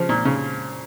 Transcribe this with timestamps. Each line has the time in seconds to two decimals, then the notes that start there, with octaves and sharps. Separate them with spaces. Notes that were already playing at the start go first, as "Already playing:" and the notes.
Already playing: C#3 F3
0.09 A#2
0.25 C#3